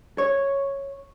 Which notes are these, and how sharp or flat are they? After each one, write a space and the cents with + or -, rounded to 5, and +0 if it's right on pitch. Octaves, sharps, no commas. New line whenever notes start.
C#5 -5